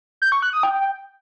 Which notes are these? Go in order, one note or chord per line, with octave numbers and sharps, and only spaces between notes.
G6
C#6
F#6
D#6
G5